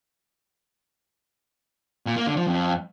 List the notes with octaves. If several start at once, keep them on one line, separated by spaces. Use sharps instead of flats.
A#2
A#3
D3
F3
F2